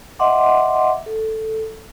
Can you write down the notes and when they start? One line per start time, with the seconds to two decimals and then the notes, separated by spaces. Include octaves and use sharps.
0.19 D#5 E5 F#5 C6 D6
1.06 A4